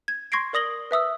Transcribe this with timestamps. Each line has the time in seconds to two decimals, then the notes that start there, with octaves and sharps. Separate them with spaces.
0.08 G#6
0.32 C6 C#6 G#6 A#6 C7 D7
0.53 A#4 D5 D#6 A#6 F#7 G7
0.91 B4 E5 D#6 E6